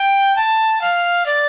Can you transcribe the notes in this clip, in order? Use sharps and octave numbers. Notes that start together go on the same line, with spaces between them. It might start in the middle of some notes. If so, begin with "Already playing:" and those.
Already playing: G5
A5
F5
D5